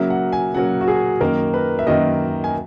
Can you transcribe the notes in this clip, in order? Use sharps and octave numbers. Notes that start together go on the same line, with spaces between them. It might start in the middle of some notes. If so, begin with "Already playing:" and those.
Already playing: C#3 F#3 A#3 E5
F#5
G#5
C#3 F#3 A#3 F#5
F#4
G#4
F#2 D#3 A#3 A#4
B4
E5
F#2 D#3 A#3 D#5
G#5